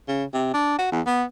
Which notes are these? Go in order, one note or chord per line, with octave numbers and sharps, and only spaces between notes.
C#3
C3
D4
F#4
E2
B3